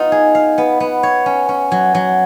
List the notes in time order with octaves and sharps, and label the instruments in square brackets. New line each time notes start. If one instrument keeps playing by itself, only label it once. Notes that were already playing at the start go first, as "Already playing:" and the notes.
Already playing: [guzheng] B3 D#4 F4
G#4
F5
B3
B3
C#5
C#4
C#4
F#3
F#3